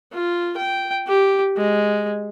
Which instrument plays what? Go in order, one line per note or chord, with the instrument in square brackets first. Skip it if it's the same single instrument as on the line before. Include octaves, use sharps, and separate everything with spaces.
[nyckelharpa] F4
G5
G4
G#3